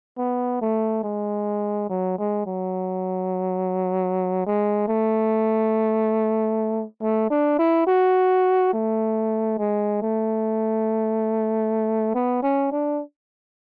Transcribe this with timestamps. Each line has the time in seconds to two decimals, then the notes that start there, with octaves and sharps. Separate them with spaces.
0.18 B3
0.62 A3
1.04 G#3
1.90 F#3
2.18 G#3
2.46 F#3
4.46 G#3
4.88 A3
7.02 A3
7.31 D4
7.59 E4
7.87 F#4
8.73 A3
9.58 G#3
10.02 A3
12.15 B3
12.43 C#4
12.72 D4